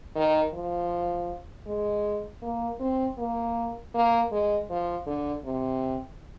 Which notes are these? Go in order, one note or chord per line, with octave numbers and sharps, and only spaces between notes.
D#3
F3
G#3
A#3
C4
A#3
A#3
G#3
F3
D3
C3